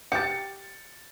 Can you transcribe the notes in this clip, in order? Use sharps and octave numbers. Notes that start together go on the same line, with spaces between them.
G4 A6 C#7